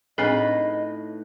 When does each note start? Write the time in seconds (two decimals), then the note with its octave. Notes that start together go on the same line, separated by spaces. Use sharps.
0.18 A2 C4 D4 D#4 F#4 G#4 B4 D#5